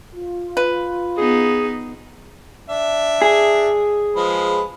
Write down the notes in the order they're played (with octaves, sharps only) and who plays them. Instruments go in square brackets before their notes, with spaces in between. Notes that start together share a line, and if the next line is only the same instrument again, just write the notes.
[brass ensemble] F4
[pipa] B4
[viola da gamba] B3 D#4 [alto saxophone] G#4
[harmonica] D4 E5
[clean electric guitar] G#4
[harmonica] F3 G#3 B4